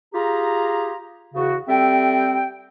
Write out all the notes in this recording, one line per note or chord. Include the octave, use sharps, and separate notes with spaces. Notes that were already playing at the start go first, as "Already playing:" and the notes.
F4 G4 G#4 A#5
E2 C#3 F#4
G3 C4 A4 E5 G5